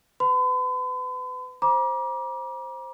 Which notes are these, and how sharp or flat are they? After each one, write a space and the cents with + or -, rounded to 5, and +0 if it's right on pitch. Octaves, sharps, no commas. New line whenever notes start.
B4 +25 B5 +45
C5 +10 A#5 +40 D6 +0